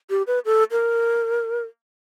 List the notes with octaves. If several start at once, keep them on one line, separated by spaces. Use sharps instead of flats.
G4
B4
A4
A#4